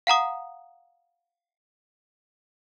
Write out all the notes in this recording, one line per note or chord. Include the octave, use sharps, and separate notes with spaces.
F5 F#5 A#5 D#6